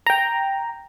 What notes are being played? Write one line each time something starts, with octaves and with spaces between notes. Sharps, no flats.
G5 A#5